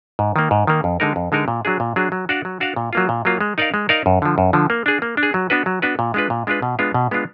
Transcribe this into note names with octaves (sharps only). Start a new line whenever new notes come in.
G#2
D#3 A#3
G#2
D#3 A#3
F2
D3 G#3 D#4 A#4
F2
D3 G#3 D#4 A#4
A#2
F#3 D4 G#4
A#2
F#3 D4 G#4
F#3
D4 F#4 D5 F5
F#3
D4 F#4 D5 F5
A#2
F#3 A#3 F4
A#2
F#3 A#3 F4
G#3
D#4 A#4 D5 F5
G#3
D#4 A#4 D5 F5
F#2
D3 F3
F#2
D3 F3
A#3
D4 G#4
A#3
D4
G#4
F#3
B3 D4 F#4 B4
F#3
B3 D4 F#4 B4
A#2
G#3 D4 F4 B4
A#2
G#3 D4 F4 B4
B2
G#3 B3 D4 F4
B2
G#3 B3 D4 F4